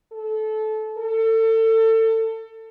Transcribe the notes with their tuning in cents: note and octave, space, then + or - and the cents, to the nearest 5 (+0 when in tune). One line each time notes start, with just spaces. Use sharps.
A4 -20
A4 +30